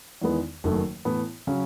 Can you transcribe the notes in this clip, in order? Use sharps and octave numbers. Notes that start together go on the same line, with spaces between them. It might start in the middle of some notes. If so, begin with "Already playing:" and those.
E2 D#3 G#3 B3 E4
F#1 F#2 D#3 A3
A2 E3 B3
C#3 F#3 C#4